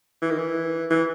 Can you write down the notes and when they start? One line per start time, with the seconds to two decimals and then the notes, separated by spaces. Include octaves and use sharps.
0.22 E3
0.31 D#3
0.38 E3
0.90 E3